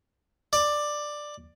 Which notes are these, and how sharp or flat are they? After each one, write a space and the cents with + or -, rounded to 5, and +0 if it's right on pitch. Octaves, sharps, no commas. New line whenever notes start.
D5 +10